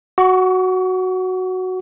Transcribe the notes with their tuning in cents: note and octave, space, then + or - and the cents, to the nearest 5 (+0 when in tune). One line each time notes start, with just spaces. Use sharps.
F#4 +0 C#6 +40